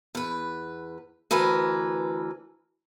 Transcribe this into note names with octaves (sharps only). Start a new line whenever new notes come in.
E2 B4
D2 E3 A#4 B4 G#5